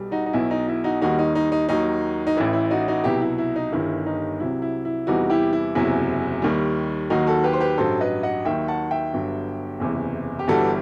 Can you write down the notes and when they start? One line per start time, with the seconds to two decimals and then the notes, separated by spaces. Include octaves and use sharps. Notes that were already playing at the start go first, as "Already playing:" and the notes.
Already playing: B1 B2 G3
0.11 D#4 F#4
0.26 D#4
0.33 B1 B2 F#3 E4
0.51 D#4
0.68 E4
0.84 D#4 F#4
1.01 D#2 D#3 G3 D#4 F#4
1.19 D#4
1.35 D#4
1.52 D#4
1.69 D#2 D#3 F#3 D#4
2.27 D#4
2.37 A1 A2 E3 E4
2.53 E4
2.71 D#4 F#4
2.88 D#4 F#4
3.04 C2 B2 F#3 E4 G4
3.21 E4
3.38 E4
3.56 D#4
3.72 G1 G2 D#3 E4
4.06 D#4
4.40 C2 C3 F#3 E4
4.62 E4
4.85 E4
5.07 E2 C3 E3 G3 D#4 F#4
5.30 E4 G4
5.53 E4
5.75 F#1 E2 C3 F#3 E4
6.42 D#2 D#3 G3
7.10 D#2 D#3 F#3 D#4 F#4
7.27 F#4 A4
7.44 G4 B4
7.53 C5
7.60 G4 B4
7.77 A1 G2 F#3 A4 C5
8.01 B4 D#5
8.23 D#5 F#5
8.45 D#2 D#3 F#3 E5 G5
8.68 F#5 A5
8.91 E5 G5
9.14 G1 G2 F#3
9.80 F#1 E2 C3 E3
10.39 G4
10.48 G1 G2 E3 G3 F#4 A4